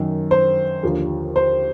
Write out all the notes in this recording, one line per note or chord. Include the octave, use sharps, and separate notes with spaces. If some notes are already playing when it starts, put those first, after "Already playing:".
Already playing: F#2 D#3
C5
D#2 D3 F3
C5